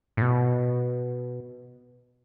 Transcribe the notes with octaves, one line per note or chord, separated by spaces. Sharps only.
A2
B2